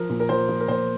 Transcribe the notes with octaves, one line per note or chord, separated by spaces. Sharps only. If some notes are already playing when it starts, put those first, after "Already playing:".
Already playing: F3 A#4
A#2
A#4
F3 C5
F3
A#4
A#2 C5